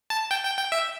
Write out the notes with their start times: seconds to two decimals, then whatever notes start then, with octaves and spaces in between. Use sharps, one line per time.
0.10 A5
0.31 G5
0.45 G5
0.58 G5
0.72 E5